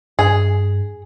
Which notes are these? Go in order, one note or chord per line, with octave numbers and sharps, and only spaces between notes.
G2 G#4